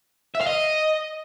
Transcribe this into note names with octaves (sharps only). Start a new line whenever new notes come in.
E5
F5
D#5